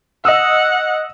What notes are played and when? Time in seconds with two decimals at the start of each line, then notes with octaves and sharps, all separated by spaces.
0.25 D#5 F#5 D#6 E6